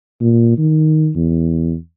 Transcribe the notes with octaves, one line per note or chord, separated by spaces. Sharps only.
A#2
D#3
E2